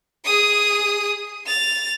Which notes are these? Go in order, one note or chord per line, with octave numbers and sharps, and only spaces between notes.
G#4 D#6
A6 F7